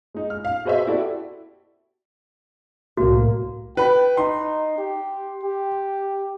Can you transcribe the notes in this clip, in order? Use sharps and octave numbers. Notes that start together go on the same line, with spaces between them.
G#3 D#4
F6
F5
F#4 G#4 B4 C5 D#5 E5
E4 F#4 G4 A4 D5
C2 A2 A#3 F#4
B4 G5 B5
D#4 C6
G4
G4